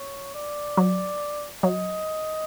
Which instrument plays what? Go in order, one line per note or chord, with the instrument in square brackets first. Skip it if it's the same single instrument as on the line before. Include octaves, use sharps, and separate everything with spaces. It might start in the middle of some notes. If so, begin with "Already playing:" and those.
Already playing: [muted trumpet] C#5
D5
[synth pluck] F#3
[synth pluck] F#3 [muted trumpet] D#5